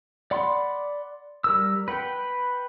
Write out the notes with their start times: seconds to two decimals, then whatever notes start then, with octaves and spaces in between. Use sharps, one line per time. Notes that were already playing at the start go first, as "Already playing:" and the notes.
0.31 D5 F#5 B5 C6
1.44 G3 A#4 E6
1.88 B4 F#5 G5